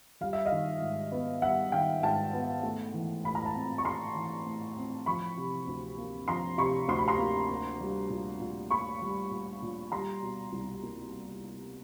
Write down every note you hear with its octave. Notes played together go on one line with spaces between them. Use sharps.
G3 F5
E5
D#5 F5
D#3
G#2
B3
G3 E5 F#5
D#3 F5 G5
G#2 G5 A5
B3
A3
E3
A2 B5
A#5
A5 B5
C4
C#6
A3 A#5 C6
E3
A2
C4
F3 B5 C#6
C3
D2
A#3
F3 A#5 C6
C3 B5 C#6
D2 C6
B5
A#5 C6
A#3
A#3
G3
A#2
A#2
A#3 B5 C#6
G3
A#2
A#2
G3 A#5 C6
B2
C2
A#3